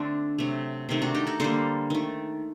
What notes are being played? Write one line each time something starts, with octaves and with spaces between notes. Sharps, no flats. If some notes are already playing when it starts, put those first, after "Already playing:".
Already playing: D3 A3 C4 D4
C3 F#3 A3
C3 D#3 A3
D4 F#4
D#4 G4
F#4 A4
D3 G3 A#3 A4 C5
D#3 A3